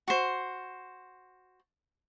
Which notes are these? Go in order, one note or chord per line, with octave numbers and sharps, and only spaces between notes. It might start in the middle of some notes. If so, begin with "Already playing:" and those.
F#4 C5